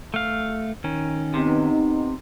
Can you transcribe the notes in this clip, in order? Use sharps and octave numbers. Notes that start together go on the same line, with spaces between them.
A3 F5
D#3 C#4
C3 B3 D#4